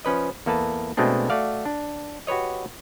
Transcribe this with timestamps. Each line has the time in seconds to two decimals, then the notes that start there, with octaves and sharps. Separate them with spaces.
0.05 F3 C#4 B4 D#5
0.46 E2 A#3 A4 B4 A5
0.97 B2 G#3 A3 C4 D4
1.30 A3 F#4 D5 F5
1.65 D4
2.27 F#4 G4 B4 C#5 D#5